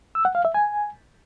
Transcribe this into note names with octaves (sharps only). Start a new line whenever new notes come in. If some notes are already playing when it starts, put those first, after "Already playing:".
E6
F#5
F5
E5
G#5